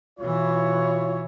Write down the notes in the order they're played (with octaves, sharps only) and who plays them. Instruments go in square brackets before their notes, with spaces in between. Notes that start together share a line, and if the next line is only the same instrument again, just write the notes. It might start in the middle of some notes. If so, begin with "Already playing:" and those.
[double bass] B2 E3 [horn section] E4 F4 C#5